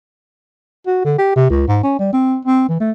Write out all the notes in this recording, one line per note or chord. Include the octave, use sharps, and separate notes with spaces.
F#4
D3
G4
C3
C#2
G#2
C#4
G3
C4
C4
E3
A3